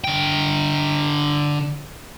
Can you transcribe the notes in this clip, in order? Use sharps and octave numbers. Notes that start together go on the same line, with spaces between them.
D3 G5